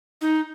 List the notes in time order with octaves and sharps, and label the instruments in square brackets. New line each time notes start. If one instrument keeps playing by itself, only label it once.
[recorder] D#4